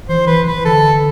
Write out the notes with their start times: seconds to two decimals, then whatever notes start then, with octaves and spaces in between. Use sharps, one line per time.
0.09 E3 C5
0.27 E3 B4
0.47 E3 B4
0.65 D3 A4